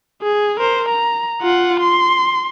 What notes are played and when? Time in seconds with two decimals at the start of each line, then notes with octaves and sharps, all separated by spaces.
0.22 G#4
0.60 A#4 C5
0.89 A#5
1.42 F4 F#5
1.80 C6